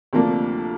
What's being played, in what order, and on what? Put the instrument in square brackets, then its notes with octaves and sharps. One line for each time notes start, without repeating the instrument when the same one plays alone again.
[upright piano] D2 C3 F3 A#3 D4